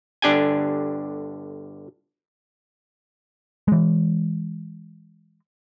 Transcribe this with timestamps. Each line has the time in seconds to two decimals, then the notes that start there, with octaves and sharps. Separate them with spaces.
0.22 G1 D3 D4 G4 G5 G#5
3.68 E3 G#3